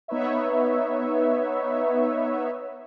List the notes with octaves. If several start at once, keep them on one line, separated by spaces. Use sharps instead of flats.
B3 D#4 B4 C#5 E5